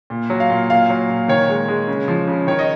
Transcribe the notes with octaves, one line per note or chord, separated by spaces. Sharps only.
A#2
F#3
F5
A#2
A#2 F5
F#3
A#2
D#3 C#5
G#3
G#3
C#3
F3
C#3
D#3 C#5
D#5